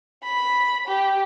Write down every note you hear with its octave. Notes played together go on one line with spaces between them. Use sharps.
B5
G4